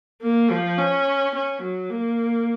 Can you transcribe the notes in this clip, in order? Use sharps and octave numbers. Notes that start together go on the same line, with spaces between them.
A#3
F3
C#4
C#4
F#3
A#3